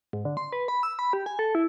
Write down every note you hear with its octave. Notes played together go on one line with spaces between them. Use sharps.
G#2
D3
C6
B4
B5
E6
B5
G4
G#5
A4
E4